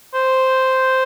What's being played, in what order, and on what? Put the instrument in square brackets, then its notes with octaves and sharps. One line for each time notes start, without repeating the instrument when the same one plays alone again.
[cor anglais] C5